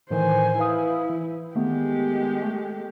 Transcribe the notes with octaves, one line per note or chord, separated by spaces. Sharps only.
A2 D#3 E3 C5 G#5
E4 B4 F5 D#6
E3
D#3 G#3 A3 B3 G4
A3